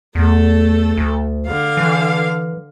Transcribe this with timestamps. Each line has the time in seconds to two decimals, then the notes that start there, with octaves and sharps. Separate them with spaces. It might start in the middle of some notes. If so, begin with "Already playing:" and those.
0.15 E2 A3 A4
0.97 D2
1.46 D3 F5
1.77 E3